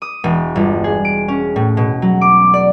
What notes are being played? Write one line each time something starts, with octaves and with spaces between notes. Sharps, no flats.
D#6
E1
G1
G#4
D7
C#4
A2
B2
F#3
D6
D5